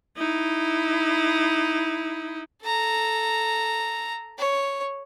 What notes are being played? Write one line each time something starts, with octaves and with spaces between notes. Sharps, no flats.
D#4 E4
A4 A#5
C#5